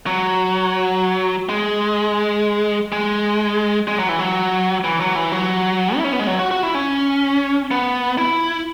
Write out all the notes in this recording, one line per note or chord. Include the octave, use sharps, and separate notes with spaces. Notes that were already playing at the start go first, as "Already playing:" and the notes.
F#3
G#3
G#3
G#3
F#3
E3
F#3
E3
F#3
E3
F#3
E4
C#4
B3
G#3
F#3
F#4
F#4
E4
C#4
B3
E4